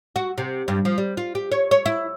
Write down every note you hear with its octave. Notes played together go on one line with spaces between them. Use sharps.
F#4
C3
G2
F3
G3
F4
G4
C#5
C#5
E4